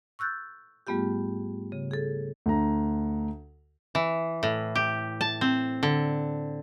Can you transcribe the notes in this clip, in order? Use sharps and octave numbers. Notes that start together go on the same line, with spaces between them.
C#6 E6 F#6 G6 A6
G#2 G3 A3 B3 F4 G4
C#3
G#4 A4
D2 D3 A#5
E3
A2
G4
A5
C4
D3